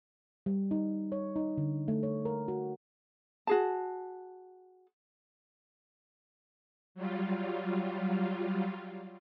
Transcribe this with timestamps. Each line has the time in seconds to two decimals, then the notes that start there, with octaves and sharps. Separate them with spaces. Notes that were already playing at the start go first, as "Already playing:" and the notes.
0.46 G3
0.71 D#4
1.12 C#5
1.36 D#4
1.58 D3
1.88 A3
2.03 C#5
2.25 A#4
2.48 F#4
3.47 F#4 G#4 A5
6.95 F#3 G3 F4